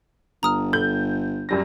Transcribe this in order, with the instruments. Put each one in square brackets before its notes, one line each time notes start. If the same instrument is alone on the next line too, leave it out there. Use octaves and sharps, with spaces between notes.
[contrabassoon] G1 [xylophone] A#5 D#6 F6
[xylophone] A4 [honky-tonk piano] G6
[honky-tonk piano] F#2 G3 A#6